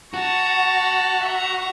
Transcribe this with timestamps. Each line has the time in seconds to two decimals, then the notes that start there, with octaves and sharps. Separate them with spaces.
0.14 F#4 A5 A#5 C#6
1.25 E5 A#5